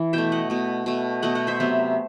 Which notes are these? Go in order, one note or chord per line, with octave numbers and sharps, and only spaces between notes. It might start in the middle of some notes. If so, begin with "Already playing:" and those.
Already playing: E3
B2 A3 E5 G5
D#5 F#5
B2 A3
B2 A3
B2 A3 D#5 F#5
D#5 F#5
C5 E5
C3 F#3 B3